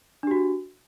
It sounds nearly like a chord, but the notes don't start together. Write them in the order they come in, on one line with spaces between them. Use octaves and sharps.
D4 G4 F#4